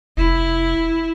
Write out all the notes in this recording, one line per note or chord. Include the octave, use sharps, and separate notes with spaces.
F1 E4